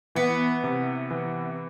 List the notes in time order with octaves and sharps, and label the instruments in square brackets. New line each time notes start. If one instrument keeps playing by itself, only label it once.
[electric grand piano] E3 [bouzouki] B3
[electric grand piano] C3
E3